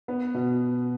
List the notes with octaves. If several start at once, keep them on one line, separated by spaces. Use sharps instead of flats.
B3
B2